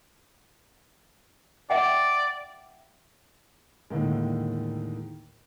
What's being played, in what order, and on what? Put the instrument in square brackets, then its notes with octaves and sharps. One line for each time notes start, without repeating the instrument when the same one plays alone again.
[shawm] D5 [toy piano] E5 F#5 G5
[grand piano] D#2 A2 D3 D#3 G#3